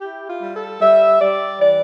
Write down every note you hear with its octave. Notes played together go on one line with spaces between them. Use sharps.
E4 G4
F4
G3
A4
G3 E5
G3 D5
E3 D5